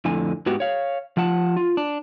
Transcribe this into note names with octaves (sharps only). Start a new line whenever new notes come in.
F2 A2 D3 G#5
G#2 B3 F#4 G4
C#5 F5
F3 F4 F#5 A5
F4
D4